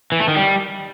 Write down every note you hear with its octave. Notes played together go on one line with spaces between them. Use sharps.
E3
A3
D#3
G3